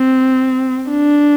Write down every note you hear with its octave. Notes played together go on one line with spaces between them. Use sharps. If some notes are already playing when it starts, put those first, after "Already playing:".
Already playing: C4
D4